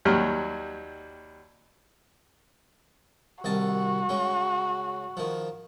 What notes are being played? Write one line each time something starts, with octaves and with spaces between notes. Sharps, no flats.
D#2 F#3 G3 F6
C2 D#3 F#4 A5
C#3 G#3
D#3 F3